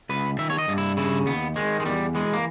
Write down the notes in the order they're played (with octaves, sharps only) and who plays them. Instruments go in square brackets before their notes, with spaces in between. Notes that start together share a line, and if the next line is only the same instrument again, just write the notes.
[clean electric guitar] C#2 B4
D#3 E5
C#5
D#5
G2
E4
C#3 E4
D#2 B3
D#3 G#3
G#3
E2 G3
E3 G#3
A#3